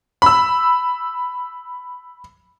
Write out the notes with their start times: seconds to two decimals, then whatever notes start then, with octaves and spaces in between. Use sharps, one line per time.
0.22 B5 E6